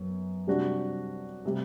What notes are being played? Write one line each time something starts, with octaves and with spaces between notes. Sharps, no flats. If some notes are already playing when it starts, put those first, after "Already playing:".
Already playing: F#2 B3
C3 G3 D4 F#4
C3 G3